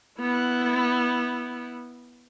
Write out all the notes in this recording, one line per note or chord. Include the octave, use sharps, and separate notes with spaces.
B3 E4